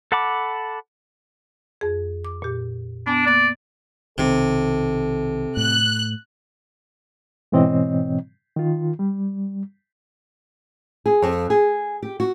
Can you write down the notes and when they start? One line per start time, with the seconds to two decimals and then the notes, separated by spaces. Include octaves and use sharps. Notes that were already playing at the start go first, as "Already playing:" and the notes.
0.12 A4 F#5 A5 B5 D6
1.81 F2 G#4
2.25 D6
2.42 A#2 G4
3.06 B3 D4 G#5
3.26 A#3 D5 F#6
4.18 B1 C3 D#3 A4
5.57 A2 F#6
7.52 G#2 B2 E3 C4 C#5 D#5
8.56 D#3 F4
8.99 G3
11.06 G#4
11.22 F2
11.50 G#4
12.02 G4
12.20 F#4